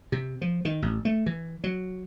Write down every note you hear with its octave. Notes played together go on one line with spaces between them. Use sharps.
C3
F3
D#3
A1
A3
E3
F#3